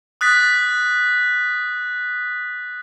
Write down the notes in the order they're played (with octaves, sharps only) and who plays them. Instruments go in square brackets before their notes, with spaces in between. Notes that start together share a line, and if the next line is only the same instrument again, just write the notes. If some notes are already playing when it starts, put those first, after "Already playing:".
[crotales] D#6 F#6 A6 B6